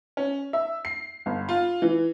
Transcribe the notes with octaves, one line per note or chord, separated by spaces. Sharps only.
C#4
E5
C7
G1
F4
E3